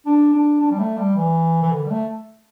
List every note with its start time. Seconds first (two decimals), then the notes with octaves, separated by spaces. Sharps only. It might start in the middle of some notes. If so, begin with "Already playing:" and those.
0.06 D4
0.33 D4
0.61 D4
0.70 G3
0.79 A3
0.97 G3
1.16 E3
1.62 E3
1.71 D3
1.86 G3
1.90 A3